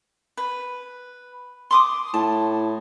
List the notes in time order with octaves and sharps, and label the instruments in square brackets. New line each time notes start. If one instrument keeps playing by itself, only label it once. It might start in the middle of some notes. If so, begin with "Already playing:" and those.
[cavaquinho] B4
C6 D6 D#6
[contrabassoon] A2 [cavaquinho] A5